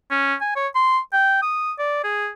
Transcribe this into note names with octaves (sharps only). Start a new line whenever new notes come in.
C#4
G#5
C#5
C6
G5
D#6
D5
G#4